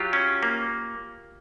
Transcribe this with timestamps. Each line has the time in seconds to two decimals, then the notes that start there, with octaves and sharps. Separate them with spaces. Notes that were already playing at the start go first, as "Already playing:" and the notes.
Already playing: F#3 F4 G4
0.13 C#4
0.43 A#3